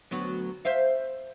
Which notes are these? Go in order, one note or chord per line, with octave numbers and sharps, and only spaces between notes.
D2 F#3 B3
C5 E5 F5